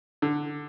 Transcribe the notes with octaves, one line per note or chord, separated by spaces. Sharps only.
D3